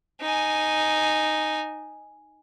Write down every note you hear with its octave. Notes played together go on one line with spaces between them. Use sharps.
D#4 G#5